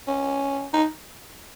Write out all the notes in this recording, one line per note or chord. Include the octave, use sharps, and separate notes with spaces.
C#4
D#4